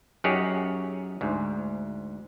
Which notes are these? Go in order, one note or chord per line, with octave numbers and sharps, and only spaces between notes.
F#2 D#4 G4 G#4 C#5 F#5
D2 G#2